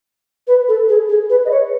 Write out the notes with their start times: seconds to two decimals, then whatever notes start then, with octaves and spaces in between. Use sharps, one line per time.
0.47 B4
0.68 A4
0.89 G#4
1.09 G#4
1.30 B4
1.45 D#5
1.51 C#5